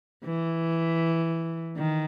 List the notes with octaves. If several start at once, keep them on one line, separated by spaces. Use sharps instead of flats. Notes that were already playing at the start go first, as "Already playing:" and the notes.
E3
D#3